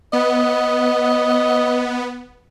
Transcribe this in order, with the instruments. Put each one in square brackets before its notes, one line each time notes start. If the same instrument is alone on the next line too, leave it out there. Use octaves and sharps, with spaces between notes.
[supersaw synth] B3 [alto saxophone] D#5